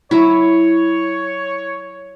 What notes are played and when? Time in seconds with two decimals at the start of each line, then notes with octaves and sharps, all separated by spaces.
0.11 F#3 E4 C#5